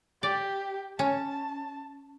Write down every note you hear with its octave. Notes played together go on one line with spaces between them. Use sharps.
G4 D5
C#4 A5